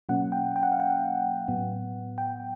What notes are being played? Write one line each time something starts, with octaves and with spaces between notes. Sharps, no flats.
B2 F#3 A#3 C#4 F#5
G5
G5
F#5
F5
F#5
A2 F#3 B3
G5